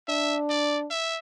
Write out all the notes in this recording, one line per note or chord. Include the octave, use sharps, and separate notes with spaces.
D4 E5
D5
E5